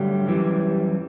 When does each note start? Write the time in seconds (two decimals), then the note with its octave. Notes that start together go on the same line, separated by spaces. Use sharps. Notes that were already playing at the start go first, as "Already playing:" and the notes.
Already playing: G2 D3 F#3 G3 A3 G4
0.27 F#2 E3 G3